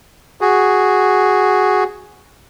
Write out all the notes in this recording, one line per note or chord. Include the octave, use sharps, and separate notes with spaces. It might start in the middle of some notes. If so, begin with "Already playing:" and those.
F#4 G#4